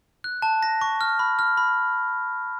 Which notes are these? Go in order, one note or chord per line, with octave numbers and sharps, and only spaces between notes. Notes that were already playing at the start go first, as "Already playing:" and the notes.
F#6
A5
A#6
C#6
F6
B5
F6
B5